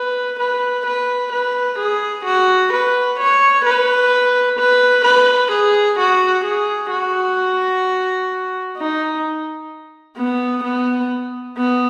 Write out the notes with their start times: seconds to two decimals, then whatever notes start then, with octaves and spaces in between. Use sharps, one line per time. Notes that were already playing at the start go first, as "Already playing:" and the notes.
Already playing: B4
0.39 B4
0.86 B4
1.32 B4
1.79 G#4
2.25 F#4
2.73 B4
3.19 C#5
3.65 B4
4.59 B4
5.05 B4
5.52 G#4
5.98 F#4
6.45 G#4
6.91 F#4
8.78 D#4
10.17 B3
10.64 B3
11.57 B3